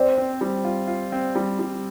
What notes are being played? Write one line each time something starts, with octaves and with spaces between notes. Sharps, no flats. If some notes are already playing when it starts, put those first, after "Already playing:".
Already playing: C4 C5 D5
C4
G3
F4
F4
C4
G3
G3